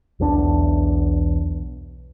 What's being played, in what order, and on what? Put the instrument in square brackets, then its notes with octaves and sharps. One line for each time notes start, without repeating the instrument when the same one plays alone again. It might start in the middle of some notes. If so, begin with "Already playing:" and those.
[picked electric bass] B1 E2 D4